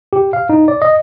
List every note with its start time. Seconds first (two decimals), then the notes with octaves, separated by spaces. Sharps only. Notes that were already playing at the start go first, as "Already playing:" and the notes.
0.13 G4
0.33 F5
0.49 D#4
0.68 D5
0.82 D#5